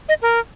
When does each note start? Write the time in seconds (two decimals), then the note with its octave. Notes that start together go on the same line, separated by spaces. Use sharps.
0.09 D#5
0.22 A#4